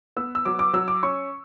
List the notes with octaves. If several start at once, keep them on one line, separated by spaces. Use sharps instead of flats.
B3 E6
E6
F#3 D6
D6
F#3 E6
D6
C#4 C#6